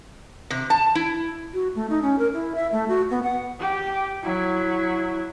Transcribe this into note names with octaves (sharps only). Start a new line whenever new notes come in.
C3
A5
E4
F#4
A3
D#4
C#4
A#4
E4
E5
A3
F#4
B3
F#5
G4
F#3 E4